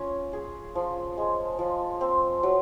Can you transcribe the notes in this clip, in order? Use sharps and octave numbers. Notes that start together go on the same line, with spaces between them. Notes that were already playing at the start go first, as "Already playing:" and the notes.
Already playing: C#4 F4
G#4
F3
G#3
F3
C4
F#3